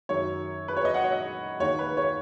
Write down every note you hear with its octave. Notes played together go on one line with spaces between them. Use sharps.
F#2 D#3 C#5
B4
C#5
D#5
F#5
C#5
D#5
D#2 D#3 C#5
B4
C#5